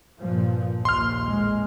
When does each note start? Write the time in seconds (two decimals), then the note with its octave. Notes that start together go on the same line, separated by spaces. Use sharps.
0.19 G2 A#2 F3
0.85 A#1 D#2 C6 F6
1.24 A1 G#3